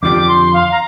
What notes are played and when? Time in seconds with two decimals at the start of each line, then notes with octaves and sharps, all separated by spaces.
0.02 F2 D3 F3 D4 G4 D6
0.28 C6
0.54 F5
0.71 A#5